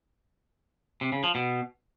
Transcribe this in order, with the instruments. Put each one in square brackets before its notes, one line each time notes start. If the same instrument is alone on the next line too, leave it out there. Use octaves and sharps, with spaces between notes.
[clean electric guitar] C3
C#3
F3
B2